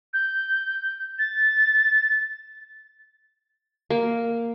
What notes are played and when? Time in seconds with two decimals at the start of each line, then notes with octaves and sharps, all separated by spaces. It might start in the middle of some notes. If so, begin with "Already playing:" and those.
0.14 G6
1.19 A6
3.90 A#3